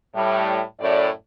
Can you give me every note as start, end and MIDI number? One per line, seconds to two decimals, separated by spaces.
0.14 0.61 45
0.14 0.61 55
0.80 1.08 42
0.80 1.08 45
0.80 1.08 74